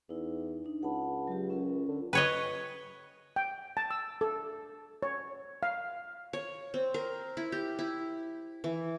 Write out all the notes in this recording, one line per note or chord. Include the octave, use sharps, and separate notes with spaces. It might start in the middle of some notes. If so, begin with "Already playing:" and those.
E2 D#4 E4
D4 D#4
C#2 F#5 A5 B5
F#3 G4
C#4 F4 A#4
D3
B4 C#5 D#5
G5
A5
E6
A4
C#5
F5
C#5
C4
A#4
E4
G4
E4
E3